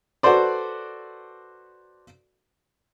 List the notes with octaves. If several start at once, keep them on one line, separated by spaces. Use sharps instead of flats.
F#4 A4 B4 C5 D5